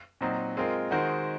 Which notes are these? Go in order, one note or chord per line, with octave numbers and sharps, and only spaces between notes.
A#2 F#3 C4 D#4
G#3 C4 F4 A#4
D#3 G#3 D#4 F#4 C5